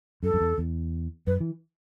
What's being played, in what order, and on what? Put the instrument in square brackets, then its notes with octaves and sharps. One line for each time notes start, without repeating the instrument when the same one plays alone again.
[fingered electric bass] F#2 [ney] A4
[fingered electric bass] F#2
E2
E2
[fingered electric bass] F#2 [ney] B4
[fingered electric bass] E3